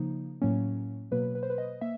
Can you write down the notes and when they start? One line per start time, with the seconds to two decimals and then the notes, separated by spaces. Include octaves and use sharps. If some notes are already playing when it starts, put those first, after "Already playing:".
Already playing: C#3 F3 A#3 D#4
0.42 A2 F#3 A#3 C#4
1.11 B2 F#3 A#3 B4
1.35 B4
1.43 C5
1.50 B4
1.58 D#5
1.81 A#3 E5